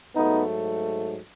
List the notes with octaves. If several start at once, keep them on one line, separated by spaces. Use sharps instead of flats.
G#2 F#3 A3 B3 D#4